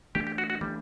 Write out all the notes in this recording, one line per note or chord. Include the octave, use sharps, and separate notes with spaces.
E3 A3 D4 G4
G4
F#4
F#4
E3 G3 A3 D4